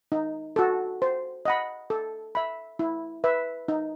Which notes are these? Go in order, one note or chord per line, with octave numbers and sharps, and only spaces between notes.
D#4
F#4 A4
C5
D#5 F#5 B5
A4
E5 B5
E4
B4 E5
D#4